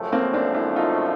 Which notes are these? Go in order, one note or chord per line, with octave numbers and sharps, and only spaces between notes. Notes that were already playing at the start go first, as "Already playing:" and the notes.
Already playing: F#2 C#3 F3 A3
A#3 C4
C4 D4
D4 E4
D#4 F4